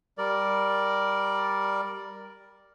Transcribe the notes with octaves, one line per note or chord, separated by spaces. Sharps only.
G3 A#4 D5